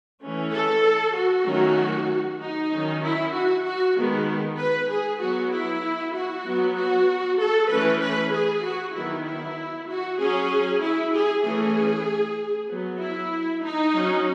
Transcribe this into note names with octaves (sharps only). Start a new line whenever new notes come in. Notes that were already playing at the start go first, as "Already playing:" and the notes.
E3 A3 C#4
A4
F#4
D#3 F#3 A3 C#4
D#4
D#3 F#3 C#4
E4
F#4
F#4
D#3 G#3 B3
B4
G#4
F#3 B3 F#4
E4
F#4
F#3 B3
F#4
A4
E3 A3 C#4 B4
B4
G#4
F#4
D#3 F#3 B3 E4
E4
F#4
F#3 C#4 G#4
E4
G#4
E3 A3 C#4 G#4
F#3 B3
E4
D#4
F#3 C#4